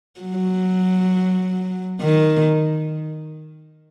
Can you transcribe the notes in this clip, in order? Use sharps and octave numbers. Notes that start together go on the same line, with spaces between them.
F#3
D#3